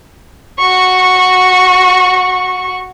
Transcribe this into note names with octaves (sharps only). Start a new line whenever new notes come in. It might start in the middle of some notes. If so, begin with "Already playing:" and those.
F#4 C#6